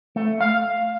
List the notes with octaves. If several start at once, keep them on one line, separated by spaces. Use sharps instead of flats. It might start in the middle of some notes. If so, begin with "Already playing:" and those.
A3
F5